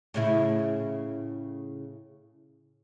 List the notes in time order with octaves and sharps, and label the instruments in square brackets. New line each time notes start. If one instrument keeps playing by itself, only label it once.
[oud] A2 C#3 E4